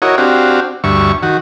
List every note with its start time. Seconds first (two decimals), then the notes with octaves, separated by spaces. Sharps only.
0.02 E4 F#4 A#4 C#5 D#5
0.18 C4 D4 F#4 G4 F5
0.84 D2 G2 E5 C#6
1.23 D#3 F#4